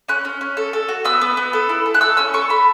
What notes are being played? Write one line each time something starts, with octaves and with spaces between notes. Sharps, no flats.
C#4 F#6
C#4
C#4
A4
A4
F#4
B3 E6
B3
B3
A4
E4
A4
F#6
A4 E6
C#4 E6
A4 C#6
A4 B5